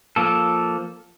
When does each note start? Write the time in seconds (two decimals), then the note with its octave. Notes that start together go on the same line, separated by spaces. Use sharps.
0.16 F3 A#3 A4